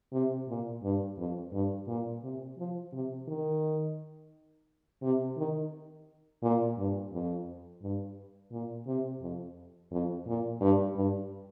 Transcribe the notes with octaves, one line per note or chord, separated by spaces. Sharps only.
C3
A#2
G2
F2
G2
A#2
C3
F3
C3
D#3
C3
D#3
A#2
G2
F2
G2
A#2
C3
F2
F2
A#2
G2
G2